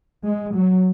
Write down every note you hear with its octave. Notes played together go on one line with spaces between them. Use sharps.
G#3
F#3